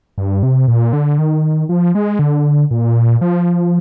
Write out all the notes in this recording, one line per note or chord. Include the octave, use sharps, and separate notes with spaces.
G2
C3
A#2
D3
D#3
F3
G#3
D3
A#2
F3